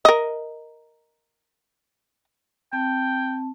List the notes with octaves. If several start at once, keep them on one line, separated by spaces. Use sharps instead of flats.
A#4 D#5
C4 G5 A5